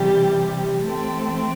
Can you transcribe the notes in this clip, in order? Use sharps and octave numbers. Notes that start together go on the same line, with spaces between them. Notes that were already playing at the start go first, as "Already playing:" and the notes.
Already playing: C3 E3 G3 G4
E3 A3 C4 A4